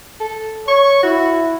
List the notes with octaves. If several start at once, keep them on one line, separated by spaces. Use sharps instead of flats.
A4
C#5 C#6
E4 F#4